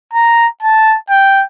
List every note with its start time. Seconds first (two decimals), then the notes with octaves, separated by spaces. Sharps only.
0.13 A#5
0.63 A5
1.10 G5